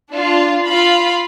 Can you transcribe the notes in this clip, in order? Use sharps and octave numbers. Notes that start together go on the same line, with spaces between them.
D4 F4
F4 F5 B5